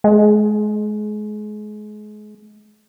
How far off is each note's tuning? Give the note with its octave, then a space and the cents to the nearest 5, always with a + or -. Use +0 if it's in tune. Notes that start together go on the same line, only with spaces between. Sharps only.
G#3 +30